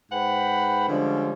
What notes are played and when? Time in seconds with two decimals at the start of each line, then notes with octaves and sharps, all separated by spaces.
0.12 G#2 B4 C5 F#5 G5 B5
0.89 D3 F3 G3 G#3 C#4